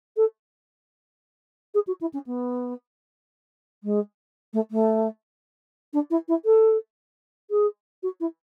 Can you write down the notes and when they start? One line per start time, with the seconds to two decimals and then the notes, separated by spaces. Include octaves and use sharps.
0.16 A4
1.74 G#4
1.87 F#4
2.00 E4
2.13 C#4
2.26 B3
3.83 G#3
4.53 A3
4.71 A3
5.93 D4
6.10 E4
6.28 E4
6.45 A4
7.50 G#4
8.02 F#4
8.20 E4